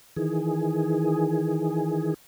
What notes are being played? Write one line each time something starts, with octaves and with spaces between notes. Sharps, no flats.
D#3 E3 G#4